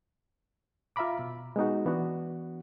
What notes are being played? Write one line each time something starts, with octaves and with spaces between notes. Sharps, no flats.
F4 E5 F5 A#5 B5 D6
B2
G#3 B3 D#4 F#4
E3 B3 D4 F#4